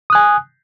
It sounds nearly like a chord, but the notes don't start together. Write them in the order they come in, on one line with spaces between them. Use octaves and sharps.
D#6 F#6 G#5